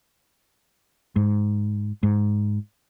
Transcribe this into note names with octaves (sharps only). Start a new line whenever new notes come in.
G#2
G#2